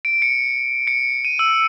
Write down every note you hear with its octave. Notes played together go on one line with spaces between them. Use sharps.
D7
C#7
C#7
D#7
E6